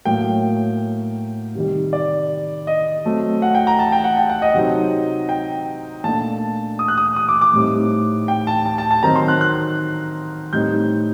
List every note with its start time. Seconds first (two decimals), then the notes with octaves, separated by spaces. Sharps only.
0.05 A2 F#3 A#3 G5
1.55 C3 D#3 G3
1.93 D5
2.67 D#5
3.05 F#3 A3 C4
3.42 F#5
3.55 G5
3.67 A#5
3.79 A5
3.92 G5
4.04 F#5
4.17 G5
4.30 F#5
4.42 D#5
4.54 C3 F#3 C4 D#4
5.29 G5
6.04 A#2 A3 D4 A5
6.79 D#6
6.88 F#6
6.98 D#6
7.16 D#6
7.29 D6
7.41 D6
7.53 A2 G3 C4 D#4
8.28 G5
8.47 A5
8.66 A5
8.78 A5
8.91 A5
9.03 D#3 F#3 C4 D#4 A#5
9.16 C6
9.28 F#6
9.41 F#6
10.53 A2 G3 C4 D#4 G6